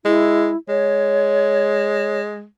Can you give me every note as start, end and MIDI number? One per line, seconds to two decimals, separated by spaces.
0.05 0.50 56
0.05 0.56 64
0.69 2.45 56
0.69 2.20 73